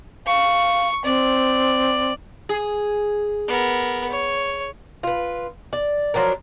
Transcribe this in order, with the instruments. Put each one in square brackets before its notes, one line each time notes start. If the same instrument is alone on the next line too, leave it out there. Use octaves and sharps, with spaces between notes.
[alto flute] F5 [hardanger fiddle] C#6
[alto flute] C4 [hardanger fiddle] D5
[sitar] G#4
[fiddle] B3 A#4
C#5
[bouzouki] F4 B4
D5
F3 F#3 D4 A#4